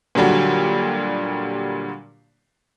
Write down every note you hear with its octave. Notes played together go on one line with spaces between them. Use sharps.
A#2 D3 F#3 G3